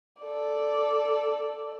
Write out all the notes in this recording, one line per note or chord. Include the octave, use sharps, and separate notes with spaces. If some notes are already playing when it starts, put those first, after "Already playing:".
A4 D5